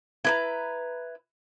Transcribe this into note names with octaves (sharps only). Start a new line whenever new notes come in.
E4 B4 A#5